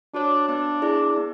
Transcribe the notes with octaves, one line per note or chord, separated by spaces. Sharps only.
D4 F#4 C#5
B3 D4
E4 G#4 D5
B3